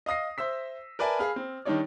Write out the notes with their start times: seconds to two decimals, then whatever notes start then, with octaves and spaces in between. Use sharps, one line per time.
0.06 D#5 F5 D#6 A#6 C7
0.38 C5 E5 E6 B6
0.99 A#4 B4 D5 E5 G#5 A5
1.19 G#4 F5 B5 F6
1.36 C4
1.65 D#3 G3 D4 D#4 C#5 D5